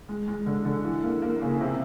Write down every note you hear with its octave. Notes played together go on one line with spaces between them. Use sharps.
G#3
G#3
D3
D3
E3
A#3
A#3
C#3
C3